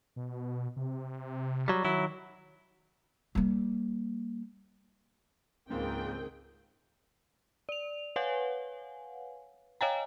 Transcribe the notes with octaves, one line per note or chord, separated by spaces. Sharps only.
B2
C3
F#3 G3
D#3 F#3 E4
G3 A#3
C#2 G#2 D#3 A#3 C4 G#4 G5
D5 F7
B4 C#5 F5 F#5 G#5
C#5 D#5 F5 G5 G#5 A#5